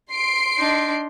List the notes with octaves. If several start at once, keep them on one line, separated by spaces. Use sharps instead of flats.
C6 C7 D7
D4 D#4